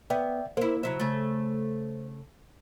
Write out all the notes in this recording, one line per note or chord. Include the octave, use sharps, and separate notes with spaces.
B3 D5 E5 G5
A#3 E4 A#4 C5
C#3 F#3 C5 E5
C#3 A3